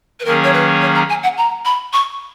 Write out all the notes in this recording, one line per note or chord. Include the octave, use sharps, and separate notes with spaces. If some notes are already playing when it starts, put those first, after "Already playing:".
B4
D#3 F#3 A#3 C#4 G#4 A#4
C#5
B4
C#5
A#5
G#5
F#5
A#5
B5
C#6